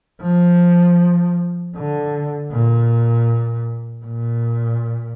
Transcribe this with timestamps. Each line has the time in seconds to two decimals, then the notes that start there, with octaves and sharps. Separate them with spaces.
0.22 F3
1.76 D3
2.52 A#2
4.05 A#2